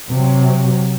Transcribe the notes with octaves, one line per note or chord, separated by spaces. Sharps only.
C3 F#3